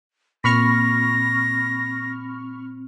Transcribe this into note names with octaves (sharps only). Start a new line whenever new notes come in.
A#2 C4 B5 C#6 F6 A#6